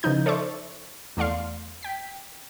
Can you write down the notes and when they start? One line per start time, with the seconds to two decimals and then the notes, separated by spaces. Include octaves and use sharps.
0.03 C#3 E3 F3 D#4 G6
0.26 A4 C5 D5 E5 C#6
1.17 E2 A3 D5 F5 C6
1.83 G5 B6